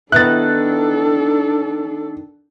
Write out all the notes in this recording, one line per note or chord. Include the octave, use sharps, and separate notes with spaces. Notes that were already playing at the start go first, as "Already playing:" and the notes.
D#3 B3 D4 E4 A4 F#6 A6